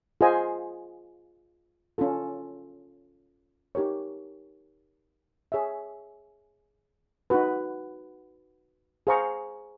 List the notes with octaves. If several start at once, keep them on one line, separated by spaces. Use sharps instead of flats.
F4 G#4 C5 D#5 G#5
C#4 F4 A4
D#4 G4 A#4 C#5
G#4 C#5 E5
D#4 F#4 B4
G#4 C5 F5 A#5 C#6